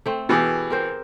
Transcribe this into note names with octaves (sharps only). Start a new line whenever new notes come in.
A3 C4
B2 E3 B3 G4 G#4
C4 A#4 C5